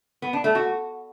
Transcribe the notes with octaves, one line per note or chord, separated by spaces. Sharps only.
B3
D4
A3
F#4